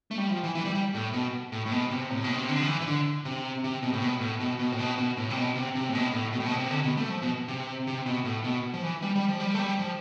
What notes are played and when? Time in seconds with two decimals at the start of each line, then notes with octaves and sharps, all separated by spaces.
0.11 A3
0.18 G3
0.30 F3
0.43 E3
0.55 E3
0.65 G3
0.75 G3
0.94 A2
1.13 B2
1.52 A2
1.66 A2
1.71 B2
1.90 C3
2.11 A2
2.24 B2
2.35 C3
2.49 D3
2.61 F3
2.67 E3
2.81 E3
2.86 D3
3.25 C3
3.64 C3
3.83 B2
3.92 A2
4.02 B2
4.21 A2
4.40 B2
4.59 B2
4.72 A2
4.79 B2
4.98 B2
5.17 A2
5.31 C3
5.37 B2
5.55 C3
5.75 C3
5.89 A2
5.95 B2
6.13 A2
6.33 B2
6.40 A2
6.46 B2
6.59 C3
6.71 D3
6.83 B2
6.97 A3
7.10 F3
7.22 B2
7.48 C3
7.87 C3
8.06 B2
8.25 A2
8.44 B2
8.74 F3
8.82 E3
9.02 G3
9.15 G3
9.28 F3
9.40 G3
9.54 A3
9.59 G3
9.79 F3